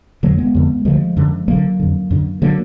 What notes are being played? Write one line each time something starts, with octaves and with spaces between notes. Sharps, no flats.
F2 D3 F#3 A#3
G#3 B3
F2 D3
D2 D3 F3 G#3
F#2 D3
D2 D3 F#3 A#3
F2 D3
F#2 D3
D3 F#3 A#3